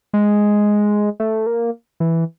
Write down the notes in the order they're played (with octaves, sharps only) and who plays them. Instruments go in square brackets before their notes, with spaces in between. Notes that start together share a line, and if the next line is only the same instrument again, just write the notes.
[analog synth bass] G#3
A3
A#3
E3